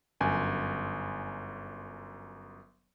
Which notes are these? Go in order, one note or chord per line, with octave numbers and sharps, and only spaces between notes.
G1 F#2 G#5